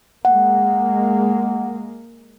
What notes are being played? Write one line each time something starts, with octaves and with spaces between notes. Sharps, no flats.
G#3 A#3 F#5